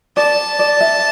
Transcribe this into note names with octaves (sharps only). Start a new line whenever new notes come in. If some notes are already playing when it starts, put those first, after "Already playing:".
D5 A5
D5
E5